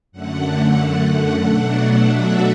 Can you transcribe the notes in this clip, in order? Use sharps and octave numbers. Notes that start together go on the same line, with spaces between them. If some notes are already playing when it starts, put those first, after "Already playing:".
F#2 D3 A3 F#5
B2 F#3 A3 D4 F#5
E5